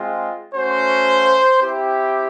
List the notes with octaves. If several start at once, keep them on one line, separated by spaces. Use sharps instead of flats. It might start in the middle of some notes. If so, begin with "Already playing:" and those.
Already playing: G#3 C4 F4
A3 C#4 F#4 C5
C4 E4 G4